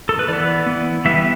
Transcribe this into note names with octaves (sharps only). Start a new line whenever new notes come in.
A4
B4
E3 B3 D5
E3 B3
E3 G3 B3 E5
E5